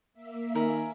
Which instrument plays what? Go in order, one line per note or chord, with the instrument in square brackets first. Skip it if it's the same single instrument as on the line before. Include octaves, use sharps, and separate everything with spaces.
[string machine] A#3 E5
[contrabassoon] D#3 [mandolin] C#4 A#4 B5